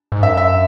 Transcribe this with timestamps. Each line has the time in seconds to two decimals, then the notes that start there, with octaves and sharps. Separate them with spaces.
0.12 G#2
0.22 F#2 E5
0.37 E5